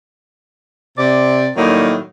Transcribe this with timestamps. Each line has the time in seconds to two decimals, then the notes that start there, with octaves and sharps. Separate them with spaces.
0.97 C3 D5
1.56 A2 D#3 F#3 G3 A#3 D#4